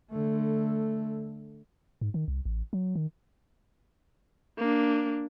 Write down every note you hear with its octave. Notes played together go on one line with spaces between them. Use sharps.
D3 A3
G#2
D#3
C2
A1
F#3
D#3
A#3 D4